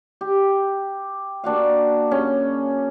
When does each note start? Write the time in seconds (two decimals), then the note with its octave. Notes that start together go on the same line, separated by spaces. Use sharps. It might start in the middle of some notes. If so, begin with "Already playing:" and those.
0.21 G4
1.44 A#3 D4 F#4 F5
2.11 C#3 C#4